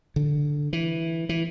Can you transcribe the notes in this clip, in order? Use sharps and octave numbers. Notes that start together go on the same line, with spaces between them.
D3
E3
E3